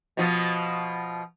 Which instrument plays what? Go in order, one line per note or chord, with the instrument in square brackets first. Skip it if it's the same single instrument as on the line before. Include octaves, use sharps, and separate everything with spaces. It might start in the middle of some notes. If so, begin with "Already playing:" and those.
[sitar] B2 F3